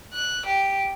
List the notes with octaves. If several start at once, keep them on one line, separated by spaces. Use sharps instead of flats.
F#6
G4